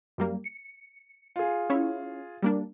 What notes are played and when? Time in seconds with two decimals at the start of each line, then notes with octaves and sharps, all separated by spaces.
0.18 F#2 G3 A#3
0.44 C#7
1.36 F4 G#4
1.70 C#4 E4 C#5
2.42 G3 A#3 D4